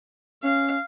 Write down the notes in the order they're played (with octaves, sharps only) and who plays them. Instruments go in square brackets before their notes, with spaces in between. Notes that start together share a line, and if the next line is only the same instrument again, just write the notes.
[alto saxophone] C#4 [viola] F5